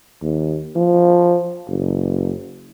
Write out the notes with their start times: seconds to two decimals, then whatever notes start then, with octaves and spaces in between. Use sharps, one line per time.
0.22 D#2
0.76 F3
1.67 F#1